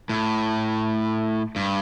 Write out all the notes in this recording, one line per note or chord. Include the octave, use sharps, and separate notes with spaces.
A2
G2